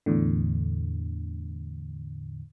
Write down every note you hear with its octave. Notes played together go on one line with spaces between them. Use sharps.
E2 A2 D3